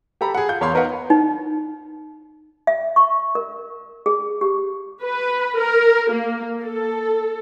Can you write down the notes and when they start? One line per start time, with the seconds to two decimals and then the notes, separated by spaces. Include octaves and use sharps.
0.21 G4 A4 A#5 B5
0.34 G#4 F#5
0.48 F4 G6
0.61 E2 A#4 C#5 F5 B5 C6
0.73 B3 D#4 A#4 B4 F5 F#5
1.10 D#4
2.67 E5
2.96 C#6
3.35 A#4
4.06 G#4
4.41 G4
5.03 B4
5.58 A#4
6.11 A#3
6.63 A4